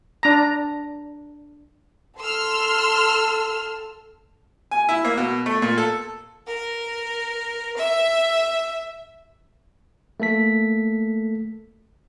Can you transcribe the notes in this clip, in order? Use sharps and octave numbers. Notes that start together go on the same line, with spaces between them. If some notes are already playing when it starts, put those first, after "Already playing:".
D4 A#5
A4 C6 E6 F6
G#5
E4
A#3
B2
A3
A#2
A4
A#4
E5
A3 A#3 A4 B6